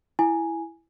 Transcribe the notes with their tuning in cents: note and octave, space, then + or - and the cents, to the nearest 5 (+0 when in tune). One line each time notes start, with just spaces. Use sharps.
E4 +5 G#5 +0